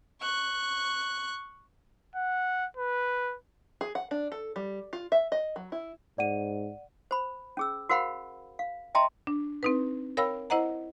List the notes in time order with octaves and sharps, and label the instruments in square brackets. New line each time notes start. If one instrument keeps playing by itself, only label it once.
[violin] C#6 F#6
[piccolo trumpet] F#5
B4
[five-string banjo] G#4
F#5
D4
A4
G3
F4
E5
D#5
F#3
E4
[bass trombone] G#2 [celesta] D5 F#5 D#7
[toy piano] C5 B5
C#4 G#4 E6
F#4 A#4 C5 F5 F#5 B5
F5
D#5 E5 G5 A5 A#5 C6
[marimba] D4
C4 D#4 B4
A#4 C#5 F5 G5 B5 E6
E4 C5 D#5 F#5 A#5